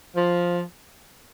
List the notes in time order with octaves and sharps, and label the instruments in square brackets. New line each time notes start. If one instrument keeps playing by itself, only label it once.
[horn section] F3